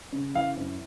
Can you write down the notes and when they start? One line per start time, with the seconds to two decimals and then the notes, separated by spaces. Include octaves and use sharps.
0.12 C#3
0.35 E3 F5
0.57 F#2